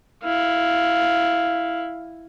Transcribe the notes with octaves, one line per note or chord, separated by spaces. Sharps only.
E4 F5